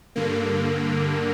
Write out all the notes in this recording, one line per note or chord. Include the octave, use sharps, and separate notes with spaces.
G2 D3 A#3